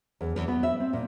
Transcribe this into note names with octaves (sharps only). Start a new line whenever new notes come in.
E2
E2
B3
E5
C4
A#2